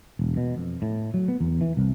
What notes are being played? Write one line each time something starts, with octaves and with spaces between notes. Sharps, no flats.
E1
B2
F2
A2
F#3
B3
E2
E3
C2